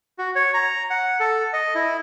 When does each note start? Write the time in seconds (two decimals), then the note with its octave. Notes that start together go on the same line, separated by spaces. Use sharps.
0.18 F#4
0.36 C#5
0.54 A#5
0.90 F#5
1.20 A4
1.53 D#5
1.75 E4